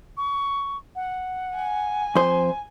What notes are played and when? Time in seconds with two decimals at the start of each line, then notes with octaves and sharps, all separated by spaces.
0.17 C#6
0.95 F#5
1.56 G#5
2.15 F2 C5